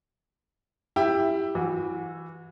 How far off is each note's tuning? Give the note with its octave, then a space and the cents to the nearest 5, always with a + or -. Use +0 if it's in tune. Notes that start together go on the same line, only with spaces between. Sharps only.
E4 +5 G4 +10 E5 +15
E3 -5 F#4 -35